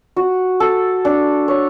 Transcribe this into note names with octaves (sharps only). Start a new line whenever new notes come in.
F#4
A4
D4
C#5